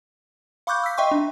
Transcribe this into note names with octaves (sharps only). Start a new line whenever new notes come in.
F5 B5 C#6 D6 F#6 G6
E6 B6
D#5 E5 G5 C6 C#6
D4